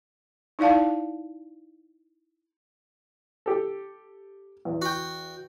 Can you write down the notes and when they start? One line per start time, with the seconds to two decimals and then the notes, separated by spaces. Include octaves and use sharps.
0.59 D#4 E4 D5 F5 A5
3.46 G4 A4
4.65 E2
4.82 F#4 G5